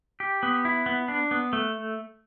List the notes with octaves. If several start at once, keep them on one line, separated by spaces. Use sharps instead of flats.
G4
B3
E4
B3
D4
B3
A3